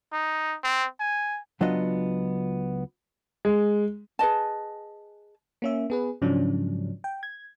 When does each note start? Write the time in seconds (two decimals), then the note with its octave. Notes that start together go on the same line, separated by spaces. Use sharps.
0.13 D#4
0.64 C4
1.00 G#5
1.61 C#2 F#3 B3 D4 F4 D#5
3.45 G#3
4.19 G#4 B4 D#5 A5
5.62 A#3 C#4 E5
5.90 B3 G#4 B4
6.22 G#2 C#3 F3 F#3 C#4 D4
7.04 G5
7.23 G#6